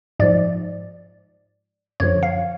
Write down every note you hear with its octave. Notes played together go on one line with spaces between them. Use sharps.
G#2 F3 D5
F#2 D3 F3 C#5
F5